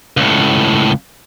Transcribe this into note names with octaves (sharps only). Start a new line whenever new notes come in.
C#2 A2